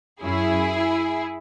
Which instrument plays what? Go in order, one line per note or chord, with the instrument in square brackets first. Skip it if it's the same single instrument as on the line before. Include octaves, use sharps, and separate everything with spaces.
[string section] F#2 F#3 C#4 E4 G#4